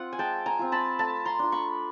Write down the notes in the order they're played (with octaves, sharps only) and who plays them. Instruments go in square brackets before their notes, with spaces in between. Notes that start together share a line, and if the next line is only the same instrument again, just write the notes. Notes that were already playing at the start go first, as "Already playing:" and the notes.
Already playing: [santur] C4 F4 F#5
G#5
G#3 G5 A5
G#5 A#5
C4 F4
A5 B5
A3 A5 B5
A#5 C6
D4 F4
B5 C#6